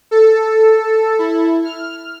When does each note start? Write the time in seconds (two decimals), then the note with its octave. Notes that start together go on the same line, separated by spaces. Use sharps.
0.11 A4
1.19 E4
1.64 F6